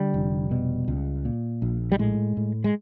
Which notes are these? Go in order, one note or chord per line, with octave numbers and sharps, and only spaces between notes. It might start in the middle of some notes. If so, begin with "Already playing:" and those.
Already playing: D3 G3
F1
B2
C#2
A#2
A#1
G3
A2 G#3
A2
G#3